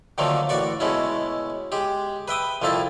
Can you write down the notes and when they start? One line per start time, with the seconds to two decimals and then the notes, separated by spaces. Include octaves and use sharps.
0.18 D3 D#3 F3 F#3 A3 A#3
0.49 A1 F#4 D5 C#6
0.80 B2 G#3 A3 C#4 E4
1.72 G#3 G4
2.28 B4 E5 G5 D#6
2.62 C2 F2 F3 A3 E4 A5